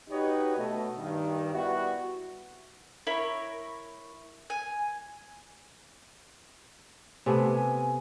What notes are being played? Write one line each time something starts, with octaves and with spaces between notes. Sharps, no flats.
D#4 F#4 G4 B4 C#5 D#5
B2 A3 D#5
G2 D#3
G3 B3 E4 F#4
E4 A#4 C#5 B5
G#5
C3 A3 B3 G#5